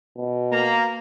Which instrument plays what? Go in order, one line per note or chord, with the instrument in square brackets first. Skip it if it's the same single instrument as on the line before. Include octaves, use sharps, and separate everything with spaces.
[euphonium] B2
[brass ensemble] A#3 [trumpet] A#5